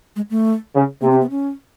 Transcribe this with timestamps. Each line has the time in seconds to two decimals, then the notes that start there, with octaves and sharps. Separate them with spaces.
0.16 G#3
0.30 A3
0.74 C#3
1.01 C3 A#3
1.11 C4
1.21 B3
1.30 C#4